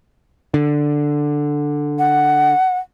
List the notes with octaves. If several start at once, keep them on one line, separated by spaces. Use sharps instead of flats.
D3
F#5